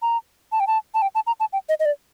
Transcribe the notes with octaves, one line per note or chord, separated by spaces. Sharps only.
A#5
A5
G5
A5
A5
G5
A5
A#5
A5
G5
D#5
D#5
D5